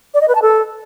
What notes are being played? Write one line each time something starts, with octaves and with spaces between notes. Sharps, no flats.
D5
D#5
B4
A5
A4